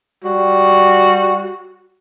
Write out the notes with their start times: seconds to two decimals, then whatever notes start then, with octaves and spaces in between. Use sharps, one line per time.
0.24 G3 F#4